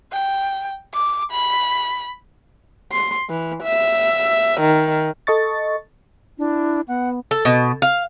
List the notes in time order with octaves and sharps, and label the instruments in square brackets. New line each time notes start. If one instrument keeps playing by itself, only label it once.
[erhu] G5
D6
B5
[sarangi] C6
E3
E5
D#3
[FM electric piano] A4 D#5 C#6 A6
[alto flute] D4 [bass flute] E4
[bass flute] B3 [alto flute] F#5
[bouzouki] A4
B2
F5